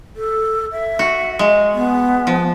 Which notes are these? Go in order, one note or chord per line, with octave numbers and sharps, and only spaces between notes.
A4
E5
F#4
G#3
B3
F3